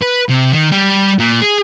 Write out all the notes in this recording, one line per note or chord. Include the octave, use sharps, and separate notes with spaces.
B4
C3
D#3
G3
A#2
G#4